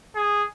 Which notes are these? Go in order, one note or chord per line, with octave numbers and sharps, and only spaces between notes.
G#4